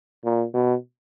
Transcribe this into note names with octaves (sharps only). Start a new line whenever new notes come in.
A#2
B2